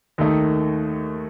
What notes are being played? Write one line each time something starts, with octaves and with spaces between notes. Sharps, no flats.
D#2 D#3 A3 D#4